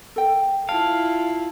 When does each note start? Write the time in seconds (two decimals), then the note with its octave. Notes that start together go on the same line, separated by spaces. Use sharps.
0.16 A4 G5
0.69 E4 F4 F5 A5